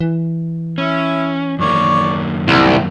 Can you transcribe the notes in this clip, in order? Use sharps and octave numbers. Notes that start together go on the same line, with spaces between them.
E3
C#4 E4
F#2 D#3 A#3 C#5 D5
C2 F#5